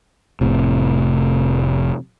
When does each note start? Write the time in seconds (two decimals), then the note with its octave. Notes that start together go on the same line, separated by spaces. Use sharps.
0.41 F1 A2 C3